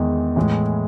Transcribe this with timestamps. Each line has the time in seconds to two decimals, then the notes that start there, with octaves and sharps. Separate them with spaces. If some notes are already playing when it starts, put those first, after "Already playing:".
Already playing: E2 D#3 G#3 B3
0.36 A2 E3 G#3